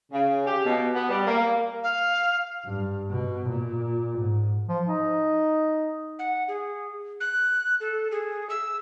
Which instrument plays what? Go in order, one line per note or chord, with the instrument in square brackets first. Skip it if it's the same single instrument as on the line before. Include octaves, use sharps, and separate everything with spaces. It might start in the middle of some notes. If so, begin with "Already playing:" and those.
[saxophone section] C#3
G4
B2
B3
G3
A#3
[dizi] F5
[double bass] G2
B2
A#2
G#2
[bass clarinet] F3
D#4
[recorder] F#5
G#4
F#6
A4
G#4
E6